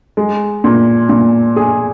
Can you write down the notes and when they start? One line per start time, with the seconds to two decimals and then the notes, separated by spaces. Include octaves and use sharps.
0.17 G#3
0.64 A#2
1.09 A#2
1.56 G#4